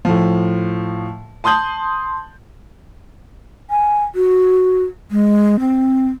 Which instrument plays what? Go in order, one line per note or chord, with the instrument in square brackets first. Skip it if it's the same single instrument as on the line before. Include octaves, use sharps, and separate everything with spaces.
[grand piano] A2 F3
A5 C6 D#6 G6 F#7
[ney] G#5
F#4
G#3
C4